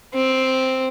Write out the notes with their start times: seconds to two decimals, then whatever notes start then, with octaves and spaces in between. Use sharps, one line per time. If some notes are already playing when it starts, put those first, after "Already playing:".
0.14 C4